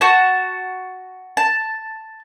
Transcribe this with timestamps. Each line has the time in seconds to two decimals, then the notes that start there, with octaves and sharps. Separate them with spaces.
0.01 F#4 A5
1.37 A5